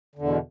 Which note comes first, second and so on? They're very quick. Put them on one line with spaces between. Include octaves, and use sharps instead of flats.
D3 E2 B2